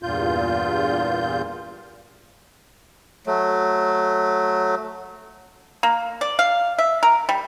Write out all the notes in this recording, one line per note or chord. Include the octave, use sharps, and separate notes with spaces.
E2 G2 A#2 F4 G6
F#3 A3
A#3
D5
F5
E5
A#4
G3